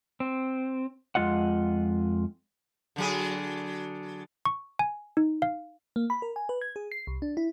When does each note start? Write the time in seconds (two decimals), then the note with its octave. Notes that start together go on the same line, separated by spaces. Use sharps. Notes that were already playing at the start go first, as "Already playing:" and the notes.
0.20 C4
1.15 F2 G#3 F4 D#5 F#5
2.96 D3 F#3 G#4
4.45 C#6
4.79 G#5
5.17 D#4
5.42 F5
5.96 A#3
6.10 B5
6.22 A#4
6.36 G#5
6.49 B4
6.61 G#6
6.76 G#4
6.92 C7
7.07 C2
7.22 D4
7.37 E4